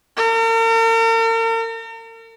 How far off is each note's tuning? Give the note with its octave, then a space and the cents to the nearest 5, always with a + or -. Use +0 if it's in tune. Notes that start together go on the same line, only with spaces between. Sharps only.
A#4 -45